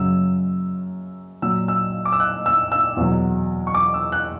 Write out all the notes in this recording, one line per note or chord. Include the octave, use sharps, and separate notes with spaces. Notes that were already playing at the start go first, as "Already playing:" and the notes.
Already playing: F#2 C#3 F#3 E6
A#2 F#3 E6
E6
D6
E6
F#6
E6
E6
E2 B2 F#3
C#6
D6
E6
F#6